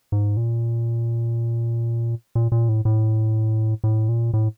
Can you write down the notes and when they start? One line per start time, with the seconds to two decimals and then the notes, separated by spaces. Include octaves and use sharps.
0.12 G#2
0.37 A#2
2.35 A#2
2.52 A#2
2.69 A2
2.85 A2
3.84 A2
4.09 A#2
4.34 A2